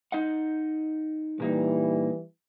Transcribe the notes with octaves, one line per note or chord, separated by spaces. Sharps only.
D#4 D#5 F#5
A#2 E3 G3 A#3 D#4